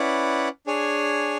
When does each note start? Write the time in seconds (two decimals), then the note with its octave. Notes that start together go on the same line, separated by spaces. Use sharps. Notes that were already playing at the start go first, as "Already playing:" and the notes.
Already playing: C#4 E4 B4 D5 F#5
0.67 D4 G#4 C#5 G#5